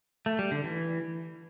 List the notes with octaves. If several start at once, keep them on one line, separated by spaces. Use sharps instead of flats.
A3
G3
D3
E3